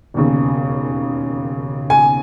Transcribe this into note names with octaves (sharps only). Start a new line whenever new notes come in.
E1 D#2 C#3
G#5